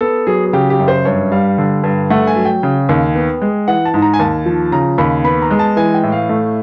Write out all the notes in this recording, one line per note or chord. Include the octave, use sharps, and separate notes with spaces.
B3 A4
F#3 G#4
G#4
C#3 G4
G4
F#2
C5
G2 C#5
G3 F5
D3
G2
A3 F#5
G#5
F#3
G5
C#3
D#2
B3
G#3
E3 F#5
A5
G#2
A#5
G#5
D#2 A5
F3
C#3 A#5
D#2 B5
B3 B5
A#5
G#3
A5
E3 G#5
G5
A2
F5
A3